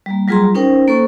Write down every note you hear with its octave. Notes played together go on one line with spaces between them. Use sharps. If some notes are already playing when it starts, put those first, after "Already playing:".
G3 A#3
F#3 G3 F4 G#4 A#5 C6
C#4 D#4 A#4 C5 G5
A#3 A4 C5 C#6